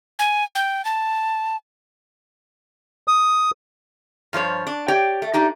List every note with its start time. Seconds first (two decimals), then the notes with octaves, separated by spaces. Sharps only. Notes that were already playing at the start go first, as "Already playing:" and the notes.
0.19 G#5
0.55 G5
0.85 A5
3.08 D#6
4.33 G2 F3 C5 C#5
4.67 D4
4.88 G4 C#5 D5 G5
5.22 A3
5.33 A3 D4 D#4 G4